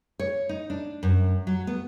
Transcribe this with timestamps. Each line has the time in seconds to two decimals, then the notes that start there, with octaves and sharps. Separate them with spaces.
0.19 C#5
0.49 D#4
0.70 D4
1.03 F#2
1.47 F#3
1.67 B3